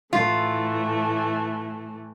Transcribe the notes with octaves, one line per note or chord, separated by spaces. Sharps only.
A2 E3 A3 F4